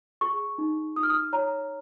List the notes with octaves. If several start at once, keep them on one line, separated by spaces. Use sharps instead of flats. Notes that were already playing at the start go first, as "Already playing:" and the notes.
G#4 C#6
D#4
D#4 D#6
F6
D#6
C#5 A#5